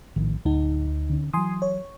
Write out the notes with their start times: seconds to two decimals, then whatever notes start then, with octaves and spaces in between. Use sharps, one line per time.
0.16 A#1 A2 D#3
0.45 D1 D2 D#4
1.10 D3 C#4
1.33 E3 F#3 G#5 C6 D#6
1.62 C#5